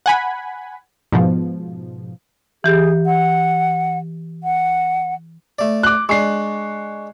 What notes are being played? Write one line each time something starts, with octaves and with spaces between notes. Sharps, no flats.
F#5 G#5 B5
G#2 B2 F3
E3 G4 G#4
F#5
F#5
A3 D5
D6 F#6
G#3 D4 C#6 C7